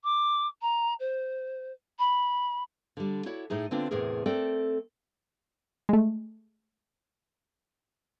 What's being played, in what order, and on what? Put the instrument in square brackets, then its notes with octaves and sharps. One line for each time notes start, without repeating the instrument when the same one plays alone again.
[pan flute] D6
A#5
C5
B5
[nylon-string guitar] D3 G3
E4 F#4 C#5 D5
A2 A3 D#4 G#4
D3 B3 C4 D4 F4
E2 A2 C3 G#4 A#4
A3 C4 A4 A#4 D5 G5
[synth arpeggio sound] G#3 A3